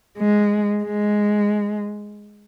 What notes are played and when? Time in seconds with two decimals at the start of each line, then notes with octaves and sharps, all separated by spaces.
0.18 G#3
0.84 G#3